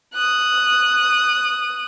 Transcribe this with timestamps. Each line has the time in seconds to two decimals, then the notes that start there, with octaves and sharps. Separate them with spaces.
0.14 D#6 F#6